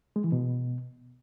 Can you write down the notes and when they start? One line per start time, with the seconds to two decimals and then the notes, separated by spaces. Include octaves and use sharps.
0.16 G#3
0.24 E3
0.32 B2